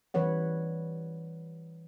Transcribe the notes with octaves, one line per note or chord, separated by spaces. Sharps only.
E3 G3 B4 C#5 F#5